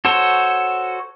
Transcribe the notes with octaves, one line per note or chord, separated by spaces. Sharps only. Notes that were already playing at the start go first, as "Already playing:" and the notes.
F#4 A4 C5 C#5